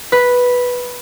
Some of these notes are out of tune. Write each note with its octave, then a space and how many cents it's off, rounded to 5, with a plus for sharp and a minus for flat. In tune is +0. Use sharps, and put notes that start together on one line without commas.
B4 -5